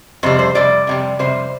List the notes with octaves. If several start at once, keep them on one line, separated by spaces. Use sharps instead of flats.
F2 C3 G3 C5
C5
F2 C3 G3 D5
F2 C3 G3
F2 C3 G3 C5